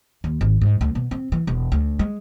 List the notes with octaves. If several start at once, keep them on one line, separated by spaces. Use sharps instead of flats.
D#2
G#1
G#2
D2
B2
C4
E3
E1
D2
G#3